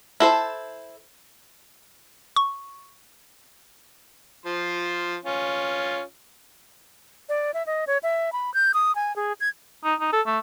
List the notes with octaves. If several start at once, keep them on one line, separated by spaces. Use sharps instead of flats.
E4 A4 C5
C#6
F3 C6
C#4 F4
D5
E5
D#5
C#5
E5
B5
G6
D#6
G#5
G#4
G#6
D#4
D#4
A4
A3